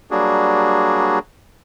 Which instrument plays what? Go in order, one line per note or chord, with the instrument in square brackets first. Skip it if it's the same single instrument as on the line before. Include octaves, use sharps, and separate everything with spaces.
[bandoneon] F#3 G3 A#3 D4 F#4 G#4